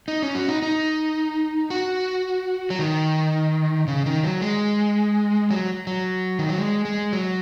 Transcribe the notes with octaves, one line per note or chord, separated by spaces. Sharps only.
D#4
C#4
F#4
D#4
D#4
F#4
F#3
D#3
C#3
D#3
F#3
G#3
F#3
F#3
D#3
F#3
G#3
G#3
F#3